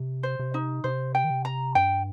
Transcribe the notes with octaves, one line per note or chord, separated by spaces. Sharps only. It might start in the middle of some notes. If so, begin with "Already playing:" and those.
Already playing: C3
C5
C3
D#4
C3 C5
G5
D#3
C3
A#5
G2 G5